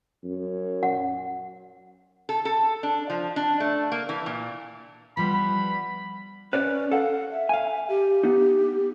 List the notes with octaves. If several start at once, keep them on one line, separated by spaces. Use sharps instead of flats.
F#2
F#5
A4
A4
D4
F3
D4
A3
A#3
E3
A#2
F3 G3 B3 B5
C#4 B4 C#5 D5
A4 F5 F#5
E5
F5 G#5
G4
B3 D#4